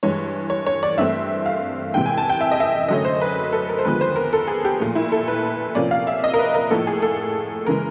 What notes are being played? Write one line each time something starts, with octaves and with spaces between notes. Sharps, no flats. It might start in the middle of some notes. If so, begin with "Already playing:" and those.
G2 E3 G#3 C#5
C#5
C#5
D5
G2 E3 A3 C4 E5
F5
C3 E3 G#3 G5
G#5
A5
G5
E5
D#5
E5
F#2 D3 F#3 A3 C#4 D#5
C5
B4
A4
A#4
C5
D#2 D3 F3 G#3 B3 B4
C5
A#4
A4
G#4
G4
A#2 F3 A3
E4
A4
B4
C3 F3 A#3 C#4 D5
F5
E5
D#5
A#4
B4
A#4
A2 F3 A#3 A4
G#4
A4
C#3 E3 G#3 A#4